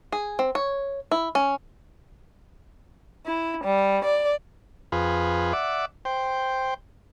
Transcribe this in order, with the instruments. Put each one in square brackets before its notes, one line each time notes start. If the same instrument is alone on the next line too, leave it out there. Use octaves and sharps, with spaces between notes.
[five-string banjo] G#4
C4
C#5
E4
C#4
[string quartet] E4
G3
D5
[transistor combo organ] F2 F4 G#4 B4
D5 E5 F#5 D6
C5 G5